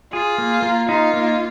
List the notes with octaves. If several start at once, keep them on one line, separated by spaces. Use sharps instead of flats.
F4 G#4
A#3
A#3
D#4 F4
A#3